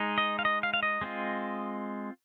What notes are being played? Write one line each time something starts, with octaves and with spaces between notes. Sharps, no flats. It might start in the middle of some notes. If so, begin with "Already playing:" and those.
Already playing: G#3 D#4
D#5
F5
D#5
F5
F5
D#5
G#3 C4 F4